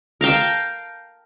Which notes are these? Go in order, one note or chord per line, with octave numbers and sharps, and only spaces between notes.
A#4 F5 G5 A5